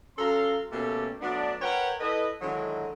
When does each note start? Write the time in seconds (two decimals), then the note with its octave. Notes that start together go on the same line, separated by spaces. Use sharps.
0.18 F#3 C#4 A4 F5 A#5 C6
0.71 B2 A3 A#3 C#4 G4 A4
1.21 F#3 A3 B3 D4
1.61 A#4 B4 C#5 F#5 G5
2.00 E4 A4 B4 D#5
2.41 D3 D#3 F#3 G#3 D#4 E4